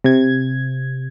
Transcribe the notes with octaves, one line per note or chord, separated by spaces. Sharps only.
C3 G#6